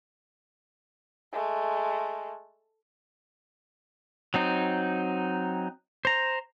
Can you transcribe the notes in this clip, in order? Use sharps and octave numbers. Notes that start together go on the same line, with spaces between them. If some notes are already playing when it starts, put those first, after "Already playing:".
G#3 A3
F#3 C4 D#4
C5 A#5